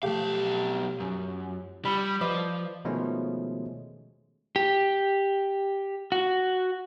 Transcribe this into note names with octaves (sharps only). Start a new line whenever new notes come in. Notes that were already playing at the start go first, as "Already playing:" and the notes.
B1 F3 A3 G4 F5
F#2
G3 B5 E6 C#7
F3 B4 D5 D#5
B2 D#3 F3 G#3 A3 C#4
G4
F#4